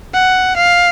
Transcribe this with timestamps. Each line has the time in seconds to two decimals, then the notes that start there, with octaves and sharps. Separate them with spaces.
0.14 F#5
0.56 F5